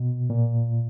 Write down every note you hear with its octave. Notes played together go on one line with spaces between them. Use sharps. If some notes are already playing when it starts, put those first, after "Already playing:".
Already playing: B2
A#2